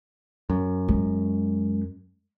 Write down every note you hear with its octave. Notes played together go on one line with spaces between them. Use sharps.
F#2
G#3